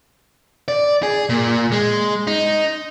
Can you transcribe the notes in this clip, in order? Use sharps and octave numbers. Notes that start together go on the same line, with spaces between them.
D5
G#4
A#2
G#3
D#4